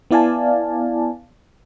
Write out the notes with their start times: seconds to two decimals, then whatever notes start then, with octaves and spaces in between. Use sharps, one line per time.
0.11 B3 E4 D5 F5 G#5 A5